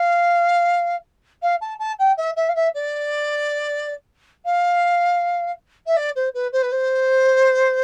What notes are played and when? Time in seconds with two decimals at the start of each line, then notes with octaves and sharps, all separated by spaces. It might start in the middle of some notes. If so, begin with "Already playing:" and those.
Already playing: F5
1.43 F5
1.61 A5
1.79 A5
1.99 G5
2.17 E5
2.36 E5
2.49 F5
2.56 E5
2.75 D5
4.45 F5
5.87 E5
5.97 D5
6.16 C5
6.34 B4
6.53 C5
6.62 B4
6.72 C5